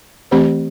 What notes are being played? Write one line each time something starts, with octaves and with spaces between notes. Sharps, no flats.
E3 A3 C4 G4 C5